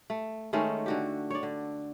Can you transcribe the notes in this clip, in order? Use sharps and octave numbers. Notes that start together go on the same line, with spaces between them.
A3
D#3 G#3 A3 C#4
D3 F#4 G4
C#5 D5
D3